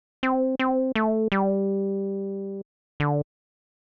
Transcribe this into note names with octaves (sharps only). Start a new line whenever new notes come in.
C4
C4
A3
G3
D3